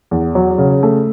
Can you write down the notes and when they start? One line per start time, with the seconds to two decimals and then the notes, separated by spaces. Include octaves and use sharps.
0.11 E2
0.35 F#3
0.58 C#3
0.83 A3